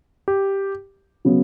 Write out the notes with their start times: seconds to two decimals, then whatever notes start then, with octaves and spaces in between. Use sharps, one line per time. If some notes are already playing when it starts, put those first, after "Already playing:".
0.28 G4
1.25 C#3 F#3 B3